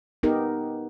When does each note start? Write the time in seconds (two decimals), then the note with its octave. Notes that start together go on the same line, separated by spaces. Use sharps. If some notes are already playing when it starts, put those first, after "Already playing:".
0.23 B3 D#4 G4 A#4